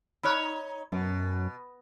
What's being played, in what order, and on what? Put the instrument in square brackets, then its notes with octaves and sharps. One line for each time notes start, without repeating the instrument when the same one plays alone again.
[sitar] D#4 C#5 [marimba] B5 F6 F#6
[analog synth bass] F#2 [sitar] B2